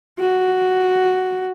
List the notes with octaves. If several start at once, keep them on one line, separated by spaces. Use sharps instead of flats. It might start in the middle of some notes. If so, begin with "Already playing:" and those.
F#4